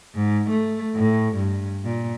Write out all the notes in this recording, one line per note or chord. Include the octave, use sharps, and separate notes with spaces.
G#2
A3
A2
G2
A#2